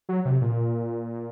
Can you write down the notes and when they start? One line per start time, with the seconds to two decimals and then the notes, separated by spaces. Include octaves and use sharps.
0.09 F#3
0.25 C3
0.41 A#2